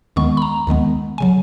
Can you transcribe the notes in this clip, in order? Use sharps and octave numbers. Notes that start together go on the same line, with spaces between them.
D#2 D#3 G#3 B3 C#6
B5
A#5
D#2 D#3 G#3 B3
C#3 F#3 G#5